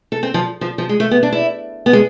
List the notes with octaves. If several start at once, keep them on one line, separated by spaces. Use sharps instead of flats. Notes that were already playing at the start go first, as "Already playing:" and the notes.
A4
C4
F3
F3
F3
G#3
A3
B3
D4
E4
B3
G#3